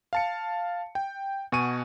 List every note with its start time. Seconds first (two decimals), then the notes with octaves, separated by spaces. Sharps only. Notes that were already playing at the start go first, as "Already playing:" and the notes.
0.13 F5 A5 C#7
0.95 G5
1.52 B2 F#4 G#5 C#6 D#7